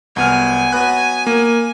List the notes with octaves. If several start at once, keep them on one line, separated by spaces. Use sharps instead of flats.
C2 F#3 B3 G#5 F6
F#3 B3 B4 F#6
A#3